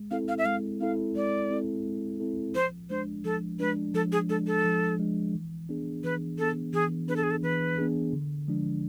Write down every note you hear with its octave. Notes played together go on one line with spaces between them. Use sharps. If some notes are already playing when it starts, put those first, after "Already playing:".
Already playing: G#3
C4 E4 A4 F5
F5
E5
G#3 F5
C4 E4 A4 F5
G#3 D5
C4 E4 A4
G#3
C4 E4 A4
F3 C5
G#3 D4 C5
F3 A4
G#3 D4 B4
F3 A4
G#4
G#3 D4 A4
A4
F3
G#3 D4
E3
B3 D4 G#4
E3 B4
B3 D4 G#4 A4
E3 G#4
B3 D4 G#4 B4
A4
G#4
A4
E3 B4
B3 D4 G#4
D3
F3 G#3 D4